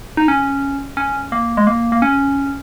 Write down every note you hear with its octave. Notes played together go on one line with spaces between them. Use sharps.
D#4
C#4
C#4
A#3
G#3
A#3
A#3
C#4